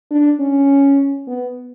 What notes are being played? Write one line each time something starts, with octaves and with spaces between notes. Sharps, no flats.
D4
C#4
B3